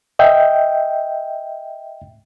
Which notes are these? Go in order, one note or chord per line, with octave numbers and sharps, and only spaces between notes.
D#5 E5 G5